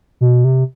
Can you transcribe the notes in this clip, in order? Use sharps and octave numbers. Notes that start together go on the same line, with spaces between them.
B2
C3